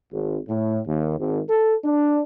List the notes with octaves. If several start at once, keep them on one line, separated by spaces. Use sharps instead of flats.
G#1
A2
D#2
G#1
A4
D4